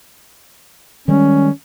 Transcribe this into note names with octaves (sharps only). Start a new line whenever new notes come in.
D#3 G3 G#3 C#4